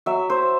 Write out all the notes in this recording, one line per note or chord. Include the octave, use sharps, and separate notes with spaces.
F#3 E5
C5